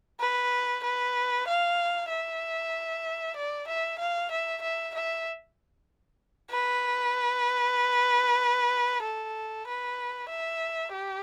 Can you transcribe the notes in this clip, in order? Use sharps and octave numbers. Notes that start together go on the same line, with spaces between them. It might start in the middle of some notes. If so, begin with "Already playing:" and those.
B4
B4
F5
E5
D5
E5
F5
E5
E5
E5
B4
A4
B4
E5
G4